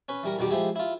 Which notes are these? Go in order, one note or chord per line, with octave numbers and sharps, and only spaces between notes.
C#4 B4
E3 G3 A#4
E2 B2 D#3 G3 D6
F3 G#3 E4 G4
E4 F4